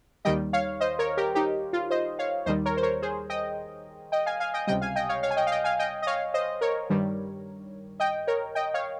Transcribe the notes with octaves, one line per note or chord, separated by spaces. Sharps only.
D#2 D#3 G3 D#5 G5
C#5 F5
C5 D#5
A#4 C#5
G4 A#4
D#4 G4
F4
C5 D#5
C#5 F5
D#2 D#3 G3 C5 D#5
A#4 C#5
C5
A#4 C#5
G#4 C5
D#5 G5
D#5 G5
F5 G#5
F5 G#5
D#5 G5
C#2 C3 G3 D#5 G5
F5 G#5
D#5 G5
C#5 F5
C#5 F5
G#5
D#5 G5
F5
D#5 G5
F5 G#5
D#5 G5
D#5
C#5 F5
C5 D#5
A#4 C#5
G2 D#3 G3
D#5 G5
A#4 C#5
D#5 G5
C#5 F5